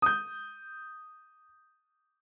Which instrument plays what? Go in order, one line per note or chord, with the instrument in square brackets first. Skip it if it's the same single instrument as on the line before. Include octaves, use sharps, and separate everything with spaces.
[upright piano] D#6 G6